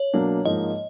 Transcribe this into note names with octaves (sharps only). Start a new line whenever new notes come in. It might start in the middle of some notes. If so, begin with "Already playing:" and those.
Already playing: C#5
B2 F#3 A#3 D4
G#2 F3 A#3 D#4 D#5